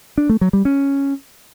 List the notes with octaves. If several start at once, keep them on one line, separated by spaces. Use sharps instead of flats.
D4
A3
F#3
G3
C#4